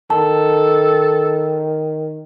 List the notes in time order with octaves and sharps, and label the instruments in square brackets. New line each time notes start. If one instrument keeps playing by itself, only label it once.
[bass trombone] D#3 [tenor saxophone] A4 [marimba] A5